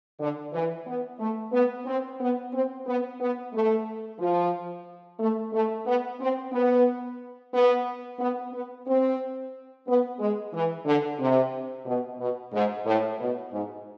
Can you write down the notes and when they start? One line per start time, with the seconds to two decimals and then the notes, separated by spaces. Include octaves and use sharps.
0.20 D3
0.53 E3
0.86 B3
1.19 A3
1.52 B3
1.86 C4
2.20 B3
2.53 C4
2.87 B3
3.20 B3
3.53 A3
4.19 F3
5.20 A3
5.53 A3
5.86 B3
6.20 C4
6.52 B3
7.53 B3
8.19 B3
8.52 B3
8.87 C4
9.87 B3
10.20 G#3
10.53 E3
10.86 D3
11.20 C3
11.86 B2
12.19 B2
12.53 G#2
12.86 A2
13.20 B2
13.53 G#2